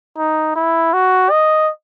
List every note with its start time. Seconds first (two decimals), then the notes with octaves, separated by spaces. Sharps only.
0.18 D#4
0.56 E4
0.93 F#4
1.30 D#5